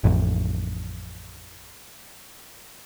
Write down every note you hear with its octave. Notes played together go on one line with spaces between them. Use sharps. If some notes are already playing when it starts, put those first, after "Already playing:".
A1 F2